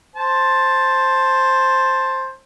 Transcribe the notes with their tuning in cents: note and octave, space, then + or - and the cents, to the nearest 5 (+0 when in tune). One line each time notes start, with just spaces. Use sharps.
C5 +10 A5 +0